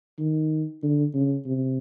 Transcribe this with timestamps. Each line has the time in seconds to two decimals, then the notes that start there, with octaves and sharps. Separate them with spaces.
0.19 D#3
0.83 D3
1.14 C#3
1.46 C3